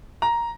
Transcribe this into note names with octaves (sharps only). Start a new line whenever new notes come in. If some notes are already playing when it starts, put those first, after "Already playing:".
A#5